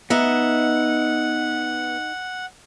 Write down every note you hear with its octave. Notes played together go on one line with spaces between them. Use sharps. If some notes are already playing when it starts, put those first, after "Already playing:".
B3 D#4 D#5 E5 F#5